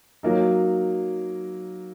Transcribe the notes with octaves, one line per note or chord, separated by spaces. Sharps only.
F#3 A#3 D#4